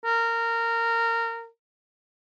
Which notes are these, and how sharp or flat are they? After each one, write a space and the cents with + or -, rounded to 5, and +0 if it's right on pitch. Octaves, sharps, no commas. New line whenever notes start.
A#4 -20